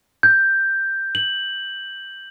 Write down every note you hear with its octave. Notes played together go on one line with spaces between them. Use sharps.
G6
F#7